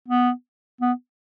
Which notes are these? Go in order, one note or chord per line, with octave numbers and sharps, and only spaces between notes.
B3
B3